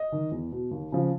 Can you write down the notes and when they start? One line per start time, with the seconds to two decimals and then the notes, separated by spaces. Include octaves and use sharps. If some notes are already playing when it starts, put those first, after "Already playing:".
Already playing: D#5
0.12 D#3
0.31 E2
0.52 B2
0.71 D#2
0.92 C#3 F3